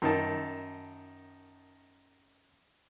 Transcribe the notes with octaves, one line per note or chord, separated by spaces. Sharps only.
F#2 D#3 A5